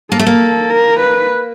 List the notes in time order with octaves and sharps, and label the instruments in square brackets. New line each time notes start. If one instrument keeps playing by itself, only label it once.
[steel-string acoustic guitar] A#3 [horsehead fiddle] A4
[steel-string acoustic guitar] A3
A#3
[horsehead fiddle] A#4
B4